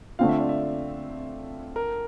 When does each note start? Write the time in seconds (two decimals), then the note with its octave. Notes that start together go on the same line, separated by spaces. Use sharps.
0.19 D3 A3 C4 F4 F5
0.29 E5
0.40 D5
0.49 E5
1.76 A#4